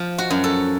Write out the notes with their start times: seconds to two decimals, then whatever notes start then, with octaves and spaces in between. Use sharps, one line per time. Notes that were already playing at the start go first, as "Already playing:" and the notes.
Already playing: F3
0.18 F#4
0.30 F#2
0.44 A4